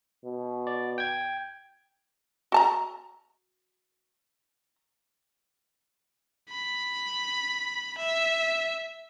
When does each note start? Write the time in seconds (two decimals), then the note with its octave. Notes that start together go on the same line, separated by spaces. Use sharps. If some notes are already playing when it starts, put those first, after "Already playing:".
0.24 B2
0.67 D5
0.98 G5 G#6
2.52 F#4 A5 A#5
6.50 B5
7.98 E5